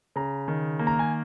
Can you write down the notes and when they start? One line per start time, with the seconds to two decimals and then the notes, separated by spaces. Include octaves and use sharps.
0.16 C#3 A#5
0.48 D#3
0.79 A#3
0.87 A#5
0.99 G#5